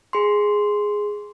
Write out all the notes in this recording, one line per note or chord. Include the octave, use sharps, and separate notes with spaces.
G#4 C6